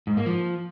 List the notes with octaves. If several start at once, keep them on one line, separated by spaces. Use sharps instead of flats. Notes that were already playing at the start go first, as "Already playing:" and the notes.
G#2
A#3
F3